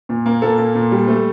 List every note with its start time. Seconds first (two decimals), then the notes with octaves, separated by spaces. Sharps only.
0.09 A#2
0.26 A#3
0.42 A#2 A4
0.58 A#3
0.75 A#2
0.91 G3
1.08 A3